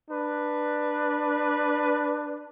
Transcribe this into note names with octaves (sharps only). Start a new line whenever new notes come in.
D4 B4